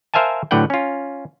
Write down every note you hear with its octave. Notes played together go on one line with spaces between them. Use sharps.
A#4 C5 E5 F5 G#5 A5
A2 D3 F#3 B4 F#5 G5
C#4 F4